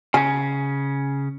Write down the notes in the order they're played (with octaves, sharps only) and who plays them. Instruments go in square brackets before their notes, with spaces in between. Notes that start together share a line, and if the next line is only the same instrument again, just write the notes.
[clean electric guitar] C#3 C#4 [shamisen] G#4